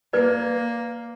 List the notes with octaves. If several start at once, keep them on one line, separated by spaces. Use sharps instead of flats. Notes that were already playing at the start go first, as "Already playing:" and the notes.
A#3 B4 D5